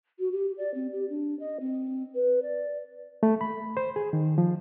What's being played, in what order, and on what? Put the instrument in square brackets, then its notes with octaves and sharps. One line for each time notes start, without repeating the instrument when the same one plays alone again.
[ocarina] F#4
G4
D5
C4
G4
D4
D#5
C4
B4
D5
[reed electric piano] A3
B5
C5
G#4
D#3
F3